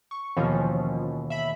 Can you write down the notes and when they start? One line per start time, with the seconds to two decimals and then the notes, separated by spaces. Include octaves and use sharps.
0.11 C#6
0.37 D#2 B2 E3 F3 C#4
1.30 E5 B5